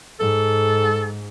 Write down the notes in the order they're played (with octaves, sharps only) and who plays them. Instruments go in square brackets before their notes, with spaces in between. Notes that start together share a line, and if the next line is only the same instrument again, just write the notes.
[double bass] G#2 [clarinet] A4